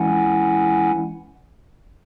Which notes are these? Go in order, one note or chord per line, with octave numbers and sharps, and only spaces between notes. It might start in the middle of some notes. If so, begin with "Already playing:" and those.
Already playing: E3 G#3 C#4 E4 F#5 G#5